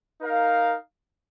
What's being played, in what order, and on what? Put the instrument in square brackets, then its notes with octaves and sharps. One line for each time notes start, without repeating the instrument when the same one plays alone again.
[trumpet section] D#4 A#4 F5